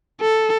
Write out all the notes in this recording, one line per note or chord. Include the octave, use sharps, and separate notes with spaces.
A4